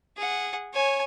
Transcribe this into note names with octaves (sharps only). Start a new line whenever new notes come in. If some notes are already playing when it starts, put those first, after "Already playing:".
G#4 F#5
C#5 G#5